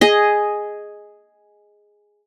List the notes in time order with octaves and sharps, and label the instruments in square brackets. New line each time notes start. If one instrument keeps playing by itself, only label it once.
[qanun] G#4 D#5